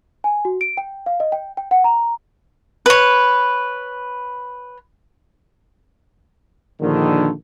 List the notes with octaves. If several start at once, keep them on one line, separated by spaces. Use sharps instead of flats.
G#5
F#4
D7
G5
F5
D#5
G5
G5
F#5
A#5
B4 C#5
A#1 D3 D#3